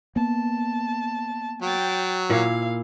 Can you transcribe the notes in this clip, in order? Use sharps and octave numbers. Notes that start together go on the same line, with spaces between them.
A#3 B3 A5
F#3 G5 A6
A#2 E4 F5